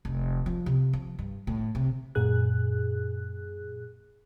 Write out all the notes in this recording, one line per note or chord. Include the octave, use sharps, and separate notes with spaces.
F1
F3
C3
F3
G2
A2
C3
F#2 A#2 G#4 F#6